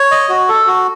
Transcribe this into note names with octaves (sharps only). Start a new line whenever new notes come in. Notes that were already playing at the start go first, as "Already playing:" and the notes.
Already playing: C#5
D#5
F#4
A4
F#4